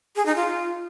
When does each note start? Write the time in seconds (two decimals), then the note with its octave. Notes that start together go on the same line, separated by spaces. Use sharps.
0.16 G#4
0.26 D#4
0.36 F4